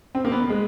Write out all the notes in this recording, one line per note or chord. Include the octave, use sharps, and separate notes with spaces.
C4
A#3
B3
G#3